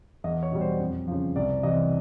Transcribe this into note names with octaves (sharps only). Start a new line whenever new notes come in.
E2 D#5
C#5
B2 G3
C5
F2
C#3 F3
C2 D5
C3 E3 D#5